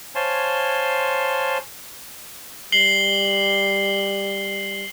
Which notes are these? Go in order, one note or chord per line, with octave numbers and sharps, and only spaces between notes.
C5 C#5 F5 G#5 A5 C6
G3 C7 F#7 G7